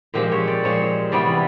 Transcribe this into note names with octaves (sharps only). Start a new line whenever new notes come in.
A#2 F3 G#3 C4 G4
C#5
D5
A#2 F3 G#3 C4 C#5
C3 E3 G3 B3 D5